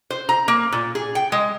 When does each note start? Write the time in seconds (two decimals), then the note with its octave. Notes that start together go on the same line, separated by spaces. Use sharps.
0.10 C5
0.29 A#5
0.48 A#3
0.72 A#2
0.95 G#4
1.15 G5
1.32 G#3